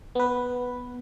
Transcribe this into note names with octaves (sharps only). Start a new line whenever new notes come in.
B3 B4